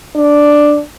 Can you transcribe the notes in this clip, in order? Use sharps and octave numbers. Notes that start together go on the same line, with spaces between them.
D4